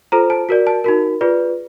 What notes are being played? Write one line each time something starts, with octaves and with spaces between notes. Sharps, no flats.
F4 A4 C5 A#5
A5
F#4 A#4 D5
A5
D#4 F#4 A#4
F4 G#4 B4 D5